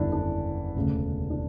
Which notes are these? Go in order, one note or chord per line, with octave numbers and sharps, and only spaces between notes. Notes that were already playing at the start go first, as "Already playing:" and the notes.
Already playing: F#1 E2 D3 G3 D4 E4
D4
E1 D2 C#3
D4